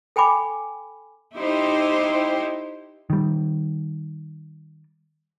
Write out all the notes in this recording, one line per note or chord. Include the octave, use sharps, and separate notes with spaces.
A4 G5 G#5 B5 D6
D#4 E4 G4 C5
D#3 G3